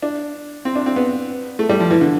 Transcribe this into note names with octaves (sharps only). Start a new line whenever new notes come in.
D4
C4
D4
C4
B3
A3
G3
F3
E3
D3